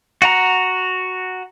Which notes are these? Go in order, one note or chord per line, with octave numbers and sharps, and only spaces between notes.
F#4 F#5 A#5